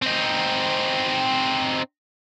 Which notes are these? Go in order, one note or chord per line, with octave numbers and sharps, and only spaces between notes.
C4 D#4